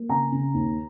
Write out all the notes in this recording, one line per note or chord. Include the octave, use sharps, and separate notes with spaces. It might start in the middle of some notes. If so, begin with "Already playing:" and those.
Already playing: A#3
C#3 G#5 A#5
C#3
D#2